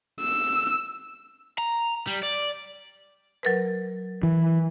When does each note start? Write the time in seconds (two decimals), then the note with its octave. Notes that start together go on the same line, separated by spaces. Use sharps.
0.21 E6
1.58 A#5
2.07 G3
2.23 D5
3.43 F#3 A#4 B4
4.23 E3